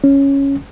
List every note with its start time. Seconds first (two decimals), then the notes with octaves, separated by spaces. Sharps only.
0.04 C#4